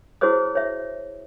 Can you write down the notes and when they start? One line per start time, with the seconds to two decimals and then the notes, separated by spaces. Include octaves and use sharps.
0.21 E4 F#4 G#4 C5 C#5 D#6
0.55 C#5 E5